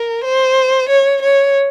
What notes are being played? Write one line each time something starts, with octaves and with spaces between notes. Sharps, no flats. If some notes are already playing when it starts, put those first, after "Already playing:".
Already playing: A#4
C5
C#5
C#5